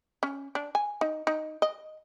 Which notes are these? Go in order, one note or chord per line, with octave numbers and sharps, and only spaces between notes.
C#4
D4
G#5
D#4
D#4
D#5